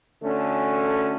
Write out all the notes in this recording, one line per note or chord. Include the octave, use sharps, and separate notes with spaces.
D3 A3 C#4 F#4